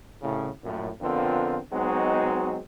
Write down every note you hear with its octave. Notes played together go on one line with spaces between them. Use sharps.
C2 A2 C#3
A#1 F#2 A2
F2 D3 B3 C4 F4 A#4
F#3 G#3 B3 C4 D#4 F#4